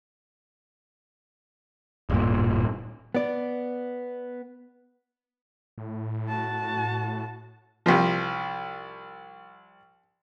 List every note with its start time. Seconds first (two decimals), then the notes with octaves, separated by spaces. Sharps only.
2.10 D1 G2 A#2
3.15 B3 D5
5.78 A2
6.29 F#4 A5
7.86 C2 F3